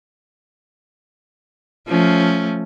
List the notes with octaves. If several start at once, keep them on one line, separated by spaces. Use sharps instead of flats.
F3 A3 C#4